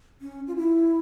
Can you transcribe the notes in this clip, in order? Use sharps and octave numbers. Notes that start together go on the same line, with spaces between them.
C#4
F4
E4